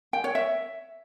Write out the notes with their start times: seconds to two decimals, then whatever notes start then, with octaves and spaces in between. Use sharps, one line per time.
0.13 G5
0.24 C#5
0.35 E5